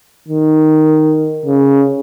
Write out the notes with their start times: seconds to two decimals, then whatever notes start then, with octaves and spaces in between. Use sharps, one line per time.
0.28 D#3
1.46 C#3